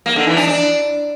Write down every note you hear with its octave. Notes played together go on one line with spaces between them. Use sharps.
A#3
D3
E3
D4
D4